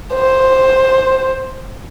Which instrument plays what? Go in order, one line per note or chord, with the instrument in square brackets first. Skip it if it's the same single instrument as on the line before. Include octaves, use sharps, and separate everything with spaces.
[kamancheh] C5